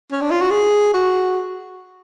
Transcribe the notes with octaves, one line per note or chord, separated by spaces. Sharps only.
C#4
D4
F4
F#4
G#4
F#4